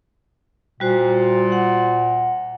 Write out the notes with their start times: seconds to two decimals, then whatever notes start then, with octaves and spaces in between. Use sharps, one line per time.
0.80 A#2 G3 F#4 C5
1.52 F#5